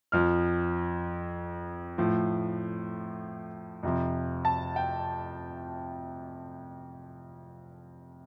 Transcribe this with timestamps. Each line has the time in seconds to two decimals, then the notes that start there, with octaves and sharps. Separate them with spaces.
0.12 F2 F3 F6
1.98 A2 F3
3.83 F2 C3 F3
4.45 A5
4.76 G5